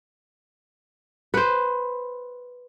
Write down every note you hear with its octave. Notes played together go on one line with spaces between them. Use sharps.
B4 C5